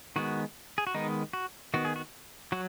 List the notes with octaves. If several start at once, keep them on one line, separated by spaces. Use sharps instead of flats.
D#3 G#3 B3 F#4
G#4
F#4
D#3 G#3 B3 D#4
F#4
D#3 B3 F#4
G#4
F#4
F#3 F#4